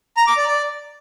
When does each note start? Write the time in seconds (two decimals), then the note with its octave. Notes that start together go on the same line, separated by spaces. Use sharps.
0.17 A#5
0.27 D6
0.37 D5
0.47 D5